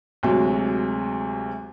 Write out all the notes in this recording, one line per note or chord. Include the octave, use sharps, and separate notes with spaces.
D2 C3 F#3 G#3